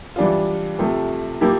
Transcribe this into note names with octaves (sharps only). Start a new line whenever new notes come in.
E3 G3 D4 F4
C3 F3 A3
F3 A#3 E4 G4